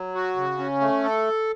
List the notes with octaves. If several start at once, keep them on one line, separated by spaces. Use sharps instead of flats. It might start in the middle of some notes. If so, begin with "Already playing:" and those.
Already playing: F#3
F#4
C#3
C#4
A3
A4